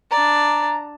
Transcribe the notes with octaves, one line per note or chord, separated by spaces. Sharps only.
D4 D5 A#5